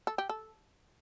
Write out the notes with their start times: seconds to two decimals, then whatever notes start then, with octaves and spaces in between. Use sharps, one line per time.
0.07 A4
0.18 G4
0.29 A4